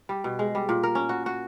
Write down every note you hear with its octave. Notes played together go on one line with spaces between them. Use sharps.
G3
B2
G#3
G3
A#2
A#4
C#4
F#4
F#4